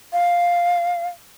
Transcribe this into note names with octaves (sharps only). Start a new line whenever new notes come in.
F5